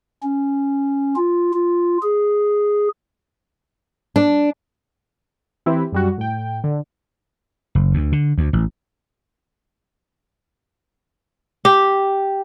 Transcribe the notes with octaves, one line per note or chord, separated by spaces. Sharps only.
C#4
F4
F4
G#4
D4
E3 C4 E4 G4 B4
F#2 G3 F#4
A2 G5
D3
F#1
D2
D3
D2
A1
G4